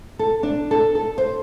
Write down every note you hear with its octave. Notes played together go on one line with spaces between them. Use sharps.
A4
D4
A4
A4
C5